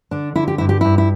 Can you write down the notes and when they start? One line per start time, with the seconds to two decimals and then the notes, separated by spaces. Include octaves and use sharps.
0.11 D3 D4
0.36 D3 E4
0.48 G4
0.58 G2 E4
0.69 G4
0.81 G2 E4
0.98 E4